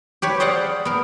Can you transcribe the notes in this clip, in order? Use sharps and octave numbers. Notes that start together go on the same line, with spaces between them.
G4 B4 C#5
G#4 C5 D5 F5 F#5
B3 A#4